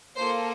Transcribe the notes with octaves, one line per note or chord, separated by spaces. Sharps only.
A#3 F4 A4 C5